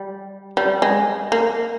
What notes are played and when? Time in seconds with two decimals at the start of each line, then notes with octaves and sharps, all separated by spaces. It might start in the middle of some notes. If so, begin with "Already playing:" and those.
Already playing: G3
0.57 G3
0.82 G#3
1.32 A#3